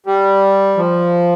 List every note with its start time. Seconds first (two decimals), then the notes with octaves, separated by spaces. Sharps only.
0.06 G3
0.77 F3